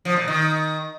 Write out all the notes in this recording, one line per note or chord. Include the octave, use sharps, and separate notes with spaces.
F3
A#2
D#3